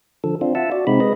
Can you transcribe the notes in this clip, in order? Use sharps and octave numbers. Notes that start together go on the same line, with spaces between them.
D3 F3 A4
C4 D4 F4
F4 E5 F#5 A5
F#4 D5
C3 G#3 C4 D#4 B5
G#3 B4 D#5